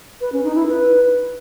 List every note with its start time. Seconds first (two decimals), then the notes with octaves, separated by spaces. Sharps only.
0.21 B4
0.32 C#4
0.44 D#4
0.55 E4
0.67 B4